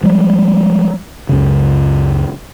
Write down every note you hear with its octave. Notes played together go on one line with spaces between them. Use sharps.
F3 G3 G#3
C#2 F#2 C#3